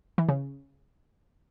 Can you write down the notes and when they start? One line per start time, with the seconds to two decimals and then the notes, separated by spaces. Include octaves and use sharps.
0.18 E3
0.29 C#3